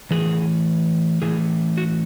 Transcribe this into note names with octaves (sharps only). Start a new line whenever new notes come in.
A2 E3 G#4
A2 E3 G#4
F#4